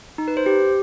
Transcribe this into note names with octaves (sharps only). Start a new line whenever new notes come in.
D#4
B4
C5
G4